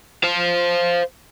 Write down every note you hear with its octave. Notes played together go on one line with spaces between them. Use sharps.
C5 F5